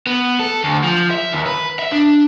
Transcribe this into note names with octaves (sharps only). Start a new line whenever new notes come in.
B3
A4
D2
F3
E5
D#2
B4
E5
D4